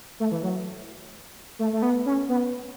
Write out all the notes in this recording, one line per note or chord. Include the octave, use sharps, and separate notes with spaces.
A3
E3
F#3
A3
A3
B3
C#4
B3